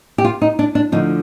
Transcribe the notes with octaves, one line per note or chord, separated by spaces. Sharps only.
G4
F4
D#4
D4
D4
D2 D3 F3 D#4